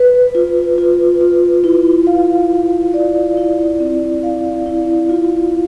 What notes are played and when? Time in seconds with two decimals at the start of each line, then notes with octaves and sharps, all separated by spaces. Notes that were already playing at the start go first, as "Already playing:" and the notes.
Already playing: B4
0.35 F4
0.78 F4
1.21 F4
1.64 E4
2.07 F5
2.50 F5
2.94 D5
3.37 E4
3.80 C4
4.23 F5
4.66 E4
5.09 F4